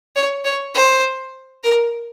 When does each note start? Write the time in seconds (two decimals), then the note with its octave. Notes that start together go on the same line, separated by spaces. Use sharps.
0.16 C#5
0.45 C#5
0.75 C5
1.64 A#4